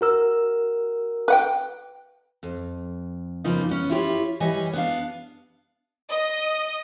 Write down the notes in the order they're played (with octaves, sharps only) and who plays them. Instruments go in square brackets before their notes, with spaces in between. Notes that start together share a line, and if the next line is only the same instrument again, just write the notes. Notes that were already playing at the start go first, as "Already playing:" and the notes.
[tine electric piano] F#4 A#4 E6
[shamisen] B4 F#5 G5
[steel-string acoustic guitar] F2
F#2 C#3 F3 A#3 B3 D#4
B3 C#4
E4 F4 G4 C#5
E3 G3 G4 C#5 D#5 G#5
B3 D4 F5
[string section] D#5